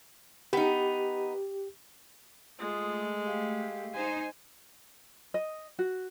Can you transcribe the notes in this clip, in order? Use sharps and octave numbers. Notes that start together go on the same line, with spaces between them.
B3 D#4 G4
G#3 A3 F4 D#6
G4 F5
D#4 C5 G#5
D#5
F#4